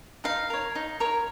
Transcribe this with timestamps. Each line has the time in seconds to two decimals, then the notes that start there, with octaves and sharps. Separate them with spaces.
0.24 D#4 F5
0.50 A#4 C#5
0.75 D#4
1.00 A#4 C#5